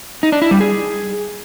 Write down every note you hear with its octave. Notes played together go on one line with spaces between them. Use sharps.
D#4
D4
E4
G3
G#4